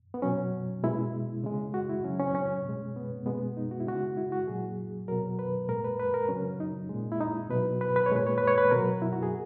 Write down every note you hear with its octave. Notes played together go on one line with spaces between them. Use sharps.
B3
B2 F#3 C#4
B2 G#3 E4
C#3 G#3
F#4
E4
C#3 F#3 C#4
C#4
C#4
B2 G#3
B3
B2 G#3 B3
D#4
F#4
E4
C#3 G#3 F#4
E4
F#4
A#2 F#3 G#4
B2 F#3 A#4
B4
A#2 G#3 A#4
B4
B4
A#4
C#3 F#3 C#4
D#4
A#2 G#3
E4
D#4
B2 F#3 B4
B4
B4
C#5
A#2 G#3 B4
C#5
B4
C#5
B4
B2 F#3 A#4
E4
F#4
G#4